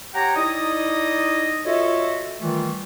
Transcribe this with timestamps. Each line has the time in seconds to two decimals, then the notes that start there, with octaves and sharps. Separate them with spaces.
0.14 G4 C#5 F#5 G5 A#5
0.36 D#4 E4 D5 D#5 D#6
1.65 F4 F#4 A4 C#5 D#5 E5
2.41 D#3 E3 G3 A3 F4